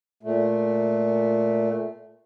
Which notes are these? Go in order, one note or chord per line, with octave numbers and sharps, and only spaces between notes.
A#2 A3